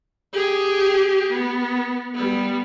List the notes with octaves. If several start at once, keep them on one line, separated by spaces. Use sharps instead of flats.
G4 G#4
B3
G3 B3